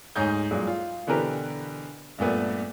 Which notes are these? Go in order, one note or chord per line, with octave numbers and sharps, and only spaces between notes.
D2 G#2 D#4 C#5 G#5 G6
G2 A#2 F#3 G#3
F4
B2 D3 E3 G4 A#4 B4
G2 A#2 A3 B3